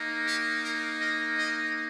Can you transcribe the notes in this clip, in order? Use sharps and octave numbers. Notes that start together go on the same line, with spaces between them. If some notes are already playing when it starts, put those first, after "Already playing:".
Already playing: A#3 D#4
G4
A#4
D#5
D#5